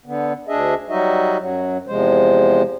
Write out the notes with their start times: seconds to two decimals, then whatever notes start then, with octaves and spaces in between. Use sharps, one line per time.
0.06 D3 B3
0.48 D2 D4 G#4 D#5 E5
0.89 F#3 G3 D#4 F#4 D#5 E5
1.39 F#2 F#3
1.87 E2 C3 F3 G#3 C5